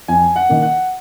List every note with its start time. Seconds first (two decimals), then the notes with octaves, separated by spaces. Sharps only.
0.08 F2 G#5
0.36 F#5
0.49 D#3 A#3
0.62 F#5